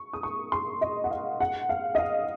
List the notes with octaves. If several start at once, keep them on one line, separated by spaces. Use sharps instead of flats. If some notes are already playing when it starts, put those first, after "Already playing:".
Already playing: C#6
D#6
C#6
C6
D#5
F#5
F5
F#5
F5
D#5
F5